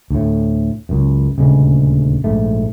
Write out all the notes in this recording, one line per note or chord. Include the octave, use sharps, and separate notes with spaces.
D2 A2
C#2 F#2
D#1 D2 C#3 G#3
A#1 G#2 A3